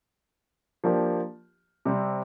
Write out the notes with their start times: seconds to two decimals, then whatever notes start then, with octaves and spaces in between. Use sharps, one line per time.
0.84 F3 A#3 D4 G4
1.85 C3 G3 C4